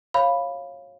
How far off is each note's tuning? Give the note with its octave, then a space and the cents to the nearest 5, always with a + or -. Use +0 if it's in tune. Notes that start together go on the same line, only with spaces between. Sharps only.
C#5 -25 F5 +0 B5 +0